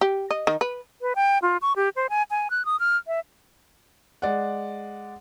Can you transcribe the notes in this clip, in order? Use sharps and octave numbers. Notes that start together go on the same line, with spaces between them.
G4
D#5
D#3
B4
B4
G5
F4
C#6
G4
C5
G#5
G#5
F#6
D#6
F6
E5
G#3 D5 F#5